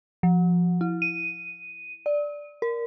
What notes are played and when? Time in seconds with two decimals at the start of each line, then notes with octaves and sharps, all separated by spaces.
0.23 F3
0.81 E4
1.02 D#7
2.06 D5
2.62 A#4